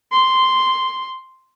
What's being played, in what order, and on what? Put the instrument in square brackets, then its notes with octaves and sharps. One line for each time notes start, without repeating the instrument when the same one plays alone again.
[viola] C6